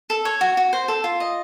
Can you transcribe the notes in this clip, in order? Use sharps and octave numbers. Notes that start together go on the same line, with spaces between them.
A4
C#5
F#4
F#4
C5
A4
F4
D#5